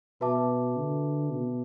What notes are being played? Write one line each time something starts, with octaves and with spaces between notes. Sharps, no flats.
B2 F#4 B4 E5 A5 D6
D3
B2